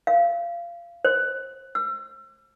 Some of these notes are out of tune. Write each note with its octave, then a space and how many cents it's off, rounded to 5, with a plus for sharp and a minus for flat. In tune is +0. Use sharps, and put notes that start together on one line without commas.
F5 -25
C5 +35
E6 +40